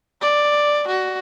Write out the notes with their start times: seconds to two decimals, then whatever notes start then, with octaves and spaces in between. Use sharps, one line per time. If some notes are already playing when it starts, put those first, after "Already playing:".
0.21 D5
0.88 F#4